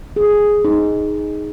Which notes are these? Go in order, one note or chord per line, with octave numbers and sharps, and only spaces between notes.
G#4
D#4